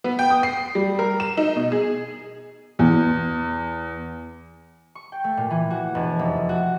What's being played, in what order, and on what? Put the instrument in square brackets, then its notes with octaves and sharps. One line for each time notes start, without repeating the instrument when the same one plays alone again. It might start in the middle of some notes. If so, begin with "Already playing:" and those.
[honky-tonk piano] B3
G5
D#6
C7
G3
A#4
E7
D#4
B2
G#4
[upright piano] E2
[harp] C#6
G5
A3
A#2
E3
F#4
E1
F1
F#4